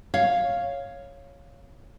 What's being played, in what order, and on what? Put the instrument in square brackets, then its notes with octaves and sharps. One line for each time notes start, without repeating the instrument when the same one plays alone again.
[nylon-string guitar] C#5 F5